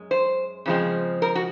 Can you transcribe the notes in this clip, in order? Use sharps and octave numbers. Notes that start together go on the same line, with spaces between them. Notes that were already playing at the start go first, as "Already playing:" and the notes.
Already playing: F#2 G#3
C5
C#3 F3 G#3 C4
A#4
F#4